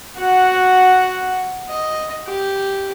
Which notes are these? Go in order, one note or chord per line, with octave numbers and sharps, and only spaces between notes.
F#4 F#5
D#5
G4